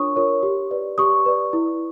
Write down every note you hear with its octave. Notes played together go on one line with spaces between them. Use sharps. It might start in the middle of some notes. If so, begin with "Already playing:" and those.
Already playing: D4 F4 A#4 C#5 C#6 D#6
F4 A#4 C#5
G4
B4 D5
G4 C#6 D#6
B4 D5
E4